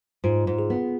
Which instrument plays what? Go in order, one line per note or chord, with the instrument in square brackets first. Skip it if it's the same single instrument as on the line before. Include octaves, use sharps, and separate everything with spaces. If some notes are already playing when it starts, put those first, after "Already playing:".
[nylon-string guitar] G#2 [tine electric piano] F4
[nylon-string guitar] G#2
[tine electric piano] G#4
[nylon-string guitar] B3